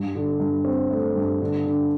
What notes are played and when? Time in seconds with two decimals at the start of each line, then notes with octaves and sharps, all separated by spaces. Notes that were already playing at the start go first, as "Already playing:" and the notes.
Already playing: G2
0.15 D3
0.40 G2
0.65 C4
0.90 A3
1.15 G2
1.41 D3
1.66 D3